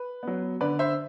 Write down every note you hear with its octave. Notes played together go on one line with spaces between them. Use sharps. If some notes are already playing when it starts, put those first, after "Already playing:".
Already playing: B4
F#3 B3
D3 B4 D5
C5 E5